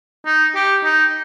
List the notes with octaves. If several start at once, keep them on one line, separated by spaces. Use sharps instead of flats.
D#4
G4
D#4